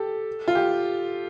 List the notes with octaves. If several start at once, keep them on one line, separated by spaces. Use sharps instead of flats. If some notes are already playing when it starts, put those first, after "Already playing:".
Already playing: G4 A4
F4
G4